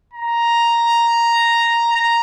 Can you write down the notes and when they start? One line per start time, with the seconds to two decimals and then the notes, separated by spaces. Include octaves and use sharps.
0.14 A#5
1.93 A#5